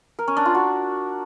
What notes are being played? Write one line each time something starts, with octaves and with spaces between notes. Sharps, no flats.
A#4
C#4
D4
F4
F#4